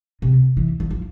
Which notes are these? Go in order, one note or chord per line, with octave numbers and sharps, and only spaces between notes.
C3
E3
E3
F3